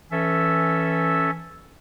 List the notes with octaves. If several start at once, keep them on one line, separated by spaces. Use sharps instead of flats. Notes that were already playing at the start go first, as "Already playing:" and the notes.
E3 C#4 A4 E5